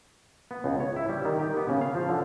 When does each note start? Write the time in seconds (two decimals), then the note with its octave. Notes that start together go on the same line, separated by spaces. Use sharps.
0.51 B3
0.64 C#2
0.80 C#5
0.96 E4
1.09 G3
1.25 D#3
1.39 G4
1.57 B3
1.69 C#3
1.81 F5
1.95 F3
2.09 D3